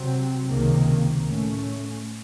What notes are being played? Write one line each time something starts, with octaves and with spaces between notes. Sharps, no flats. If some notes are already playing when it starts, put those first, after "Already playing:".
Already playing: C3 F#3 C4
C#2 C3 D#3 A#3
A2 A3 C#4